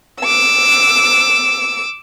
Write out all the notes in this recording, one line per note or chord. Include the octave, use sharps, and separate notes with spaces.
D6 E6